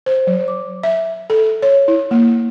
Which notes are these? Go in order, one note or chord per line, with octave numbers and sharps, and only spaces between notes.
C5
F#3
D6
E5
A4
C#5
E4
A#3